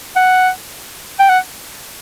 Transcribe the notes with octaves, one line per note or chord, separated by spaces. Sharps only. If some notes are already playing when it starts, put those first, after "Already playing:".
F#5
G5
F#5